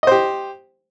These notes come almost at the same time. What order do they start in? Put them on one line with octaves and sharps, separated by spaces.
D#5 C5 G4